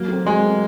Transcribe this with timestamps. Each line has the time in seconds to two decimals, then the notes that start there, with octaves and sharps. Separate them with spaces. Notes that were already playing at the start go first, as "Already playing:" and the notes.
Already playing: F#3 A#3
0.08 A3 C4
0.25 F#3 G#3
0.43 A3 C4